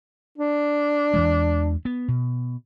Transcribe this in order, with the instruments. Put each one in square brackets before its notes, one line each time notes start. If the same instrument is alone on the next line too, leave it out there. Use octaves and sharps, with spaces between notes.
[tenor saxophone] D4
[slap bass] E2 E3 G#3
B3
B2